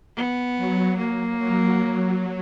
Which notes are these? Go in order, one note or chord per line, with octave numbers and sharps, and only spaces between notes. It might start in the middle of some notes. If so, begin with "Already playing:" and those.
B3
F#3
A#3
F#3